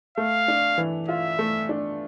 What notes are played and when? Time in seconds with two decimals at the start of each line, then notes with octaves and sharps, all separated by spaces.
0.17 A3 F5
0.48 D4
0.78 E3
1.09 F4 E5
1.39 A3
1.69 D4